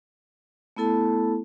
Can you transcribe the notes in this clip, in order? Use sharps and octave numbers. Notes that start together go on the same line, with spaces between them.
A3 B3 E4 A4 A5